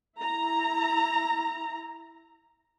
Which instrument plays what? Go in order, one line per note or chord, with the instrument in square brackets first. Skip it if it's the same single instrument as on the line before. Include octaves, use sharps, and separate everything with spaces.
[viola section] E4 A#5